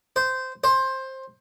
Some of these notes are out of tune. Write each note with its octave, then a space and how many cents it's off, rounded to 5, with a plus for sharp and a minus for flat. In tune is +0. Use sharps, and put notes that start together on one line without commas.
C5 -15
C5 +15